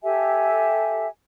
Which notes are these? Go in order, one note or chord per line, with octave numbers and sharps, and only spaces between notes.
G4 A4 E5 G#5